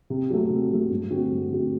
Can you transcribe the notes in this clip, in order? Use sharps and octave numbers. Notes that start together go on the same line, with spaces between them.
C3
F#3 A3
C3
F#3 A3
G2
D3 A3 C4 F#4
G2
D3 A3 C4 F#4